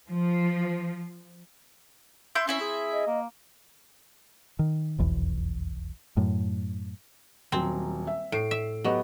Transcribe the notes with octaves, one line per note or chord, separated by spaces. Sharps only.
F3
E4 C6 G6
C4 C#4 E4 E5
G#4
D#5
A#3
D#3
F1 B1 E2
F#2 A2
D#1 F#3 C4
E5
A2 C7 D7
E5
F#3 B3 G4 D#5